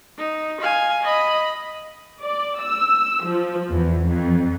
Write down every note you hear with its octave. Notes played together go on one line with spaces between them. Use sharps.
D#4
F5 G#5
D#5 B5
D5
E6
F3
E2
F2